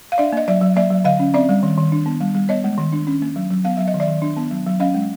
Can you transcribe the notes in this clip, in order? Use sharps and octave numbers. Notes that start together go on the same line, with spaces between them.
F5
D4 D5 E5
A#3 D#5
F#3 D5 E5
F#3
A#3 D5 E5
F#3
D3 D#5 F5
C#4
C4 D5 E5
G3
D#3
D#3
D4
B3
G3
G3
B3 C#5 D#5
G#3
D#3
D4
C#4
A#3
F#3
F#3
B3 F5
F#3 E5
D#5
D#3
D5 E5
D#3
D4
B3
F#3
F#3
C#4 D#5 F5
G#3